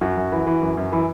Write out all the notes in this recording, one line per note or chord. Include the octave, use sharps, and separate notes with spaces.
F#2 F#4
F#2
E3
E3
F#2
F#2
E3